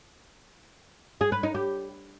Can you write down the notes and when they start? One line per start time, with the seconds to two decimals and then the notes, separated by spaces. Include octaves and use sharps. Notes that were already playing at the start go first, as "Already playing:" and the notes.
1.21 G#4
1.32 B4
1.43 D#4
1.55 G4